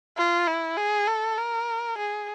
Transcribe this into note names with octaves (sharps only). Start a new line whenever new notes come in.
F4
E4
G#4
A4
A#4
G#4